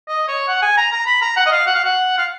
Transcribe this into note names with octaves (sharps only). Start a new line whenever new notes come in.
D#5
C#5
F#5
G#5
A#5
A#5
B5
A#5
F#5
D#5
F5
F#5
F5
F#5
F5